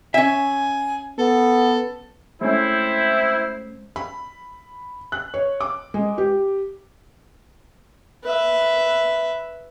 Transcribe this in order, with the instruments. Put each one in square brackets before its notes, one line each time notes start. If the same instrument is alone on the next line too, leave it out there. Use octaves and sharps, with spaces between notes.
[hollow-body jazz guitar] C#4 E5 [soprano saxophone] G#5
[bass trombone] B3 [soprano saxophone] A4
[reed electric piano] G#3 A3 C#4 [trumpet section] C4 E4 [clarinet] C5
[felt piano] B5
F#6
C#5
D6
G#3
G4
[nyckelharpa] B4 E5